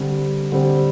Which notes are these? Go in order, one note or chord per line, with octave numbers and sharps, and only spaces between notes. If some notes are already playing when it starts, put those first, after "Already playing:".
Already playing: D3 G3 C4
D3 G3 C4